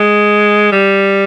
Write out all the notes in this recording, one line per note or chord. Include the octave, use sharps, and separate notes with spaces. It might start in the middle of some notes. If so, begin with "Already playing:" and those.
Already playing: G#3
G3